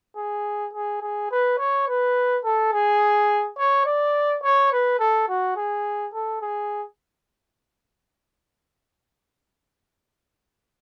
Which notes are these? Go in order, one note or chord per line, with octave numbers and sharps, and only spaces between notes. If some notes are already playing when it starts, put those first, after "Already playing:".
G#4
G#4
G#4
B4
C#5
B4
A4
G#4
C#5
D5
C#5
B4
A4
F#4
G#4
A4
G#4